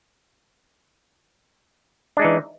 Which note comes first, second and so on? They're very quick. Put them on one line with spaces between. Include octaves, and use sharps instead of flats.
D4 G#3 D#4 E3